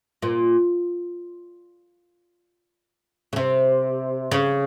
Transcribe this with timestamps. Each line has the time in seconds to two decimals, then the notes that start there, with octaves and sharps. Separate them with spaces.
0.22 A#2
3.33 C#3
3.36 C3
4.31 C#3